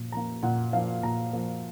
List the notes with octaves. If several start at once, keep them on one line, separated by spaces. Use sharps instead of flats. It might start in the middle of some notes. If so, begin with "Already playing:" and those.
Already playing: A#2 F3 A#3
F3 A#3 A#5
A#2 F#5
F3 A#3 F5
A#2 A#5
F3 A#3